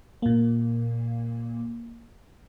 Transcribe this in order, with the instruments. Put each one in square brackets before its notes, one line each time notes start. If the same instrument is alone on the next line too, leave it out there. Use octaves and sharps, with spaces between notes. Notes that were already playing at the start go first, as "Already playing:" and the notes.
[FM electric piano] A#2 A#3